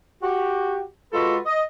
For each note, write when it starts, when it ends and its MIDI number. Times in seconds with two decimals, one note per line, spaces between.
0.23 0.83 66
0.23 0.83 67
1.13 1.37 56
1.13 1.37 65
1.13 1.37 66
1.13 1.37 69
1.13 1.37 71
1.46 1.61 75